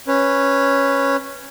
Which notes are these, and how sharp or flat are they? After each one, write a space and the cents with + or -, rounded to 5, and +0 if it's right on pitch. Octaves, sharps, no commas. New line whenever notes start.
C#4 -5 B4 +0